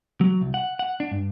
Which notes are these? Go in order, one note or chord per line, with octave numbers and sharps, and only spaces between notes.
F#3
C2
F#5
F#5
D4
G2